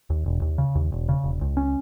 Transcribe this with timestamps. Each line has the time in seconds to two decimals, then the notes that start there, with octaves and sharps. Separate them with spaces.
0.10 D#2
0.26 E1
0.42 D#2
0.58 C#3
0.75 D#2
0.92 E1
1.09 C#3
1.24 E1
1.41 C#2
1.57 C#4